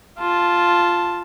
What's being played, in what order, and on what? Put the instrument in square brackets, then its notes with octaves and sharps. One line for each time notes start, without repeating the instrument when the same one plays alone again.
[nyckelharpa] F4 A5